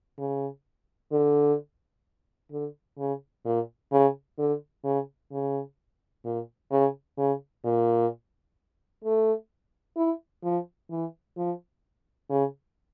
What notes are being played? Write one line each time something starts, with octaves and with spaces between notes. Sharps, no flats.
C#3
D3
D3
C#3
A#2
C#3
D3
C#3
C#3
A#2
C#3
C#3
A#2
A3
E4
F3
E3
F3
C#3